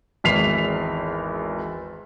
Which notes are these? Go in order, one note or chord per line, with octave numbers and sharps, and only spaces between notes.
G#1 E2 B6 C7 F7